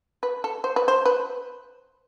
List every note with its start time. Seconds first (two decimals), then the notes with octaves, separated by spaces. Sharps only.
0.23 B4
0.44 A4
0.64 C5
0.76 B4
0.88 C5
1.05 B4